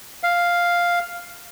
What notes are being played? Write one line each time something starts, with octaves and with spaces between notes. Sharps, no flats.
F5